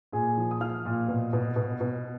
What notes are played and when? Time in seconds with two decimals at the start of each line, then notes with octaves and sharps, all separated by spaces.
0.12 A#2 G#4 G#5
0.37 F3
0.51 D#6
0.60 F3 F5 F6
0.85 A#2
1.08 B2
1.33 B2
1.56 B2
1.81 B2